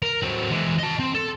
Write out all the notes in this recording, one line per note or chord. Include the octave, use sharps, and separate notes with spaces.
A#4
F#3 C4
E3 G#3
D#5 A5
C4
A4